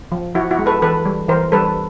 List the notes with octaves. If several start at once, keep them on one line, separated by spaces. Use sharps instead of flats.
F3
F3 E4 F#4
E4 F#4
G#3
A4 B4
E3 A4 B4
G3
E3 A#4 C5
G3 A4 B4